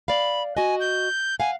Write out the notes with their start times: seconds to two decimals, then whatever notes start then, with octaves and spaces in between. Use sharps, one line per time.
0.08 D5 F5 B5
0.57 F#4 D#5 G#5
0.80 G6
1.40 F5 F#5 G#5